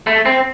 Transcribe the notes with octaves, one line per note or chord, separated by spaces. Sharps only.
A3
C4